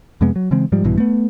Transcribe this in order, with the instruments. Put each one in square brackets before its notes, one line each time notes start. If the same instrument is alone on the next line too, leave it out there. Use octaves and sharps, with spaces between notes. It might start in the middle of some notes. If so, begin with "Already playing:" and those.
[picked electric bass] F2 C3 G#3 B3
F#3
C#3 E3 G#3 C4
G#2 F3 G3
A#1 G2 B2 E3
A3 B3